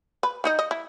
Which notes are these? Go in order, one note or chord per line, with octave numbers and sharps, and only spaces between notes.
B4
D#3 D#4 D#5
D#5
E4